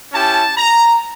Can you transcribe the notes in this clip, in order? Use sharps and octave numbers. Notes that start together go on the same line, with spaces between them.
C#4 E4 G4 A5
A#5